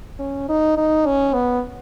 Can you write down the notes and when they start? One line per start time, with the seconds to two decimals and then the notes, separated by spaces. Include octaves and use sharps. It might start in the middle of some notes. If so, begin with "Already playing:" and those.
0.19 C#4
0.49 D#4
0.77 D#4
1.06 C#4
1.34 B3